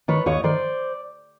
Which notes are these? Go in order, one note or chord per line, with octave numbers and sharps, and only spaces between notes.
D#3 B4 C#5
D#2 C#5 D#5
D#3 C5 D5